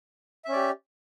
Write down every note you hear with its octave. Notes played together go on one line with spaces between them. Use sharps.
C#4 G4 D5 E5